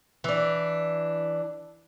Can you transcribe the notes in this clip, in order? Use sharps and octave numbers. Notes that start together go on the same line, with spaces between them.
E3 D4